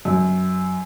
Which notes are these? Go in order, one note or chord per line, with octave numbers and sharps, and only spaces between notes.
F#2